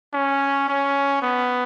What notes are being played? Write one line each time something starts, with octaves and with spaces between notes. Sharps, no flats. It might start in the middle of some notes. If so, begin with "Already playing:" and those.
C#4
C#4
B3